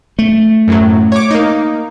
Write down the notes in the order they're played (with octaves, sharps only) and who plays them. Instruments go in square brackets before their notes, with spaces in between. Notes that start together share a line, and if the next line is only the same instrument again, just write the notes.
[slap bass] A3
[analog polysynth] F#2 A2 F#3
C#5 D6
A#3 D#4